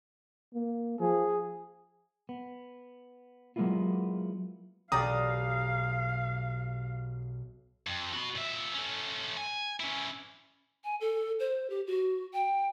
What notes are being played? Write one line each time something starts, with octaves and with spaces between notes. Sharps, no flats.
A#3
F3 G#4
B3
F#3 G#3 A#3 B3 E4 F4
B1 G4 D5 F5 A#5 D#6
F2
F#4 B5
A#2 E5
A3 C#4
G#5
C#4 E4
G#5
A4
C5
G4
F#4
G5